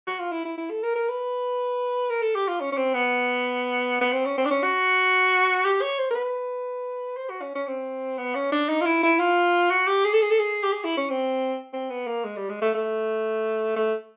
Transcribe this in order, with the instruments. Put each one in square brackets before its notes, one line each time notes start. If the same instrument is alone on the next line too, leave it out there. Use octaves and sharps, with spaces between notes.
[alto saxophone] F#4
F4
E4
E4
E4
A4
A#4
A#4
B4
A#4
A4
G4
F4
C#4
C#4
C4
B3
B3
C4
C#4
C4
D4
C#4
F#4
G4
C#5
C5
A#4
B4
C5
F#4
C#4
C#4
C4
B3
C#4
D4
D#4
F4
E4
E4
F4
F#4
G4
G#4
A4
G#4
A4
G#4
G4
G#4
E4
C#4
C4
C4
B3
A#3
G#3
G3
G#3
A3
A3
A3